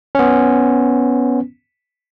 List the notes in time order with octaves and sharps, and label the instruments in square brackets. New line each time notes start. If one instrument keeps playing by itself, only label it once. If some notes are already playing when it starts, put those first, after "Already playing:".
[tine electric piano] B3 C#4